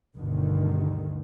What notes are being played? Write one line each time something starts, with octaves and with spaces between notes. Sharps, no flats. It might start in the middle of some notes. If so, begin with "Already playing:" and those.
G1 D2 G2 B2 D3 D#3